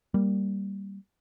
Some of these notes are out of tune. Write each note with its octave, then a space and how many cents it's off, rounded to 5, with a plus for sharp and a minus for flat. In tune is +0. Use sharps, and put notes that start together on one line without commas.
G3 +0 A#3 +0